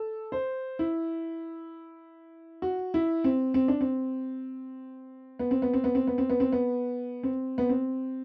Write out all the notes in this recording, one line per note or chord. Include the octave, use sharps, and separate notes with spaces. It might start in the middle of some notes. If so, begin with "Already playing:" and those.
Already playing: A4
C5
E4
F#4
E4
C4
C4
D4
C4
B3
C4
B3
C4
B3
C4
B3
C4
B3
C4
B3
C4
B3
C4